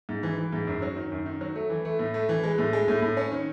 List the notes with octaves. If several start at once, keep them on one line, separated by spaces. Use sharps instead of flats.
G#2
E3
E3
G#2
F#2
F#3
D#3
F#2
D#3
F#3
A3
E3
A3
A2
A3
E3
G#3
A2
G#3
A2
A2
C#4
D#3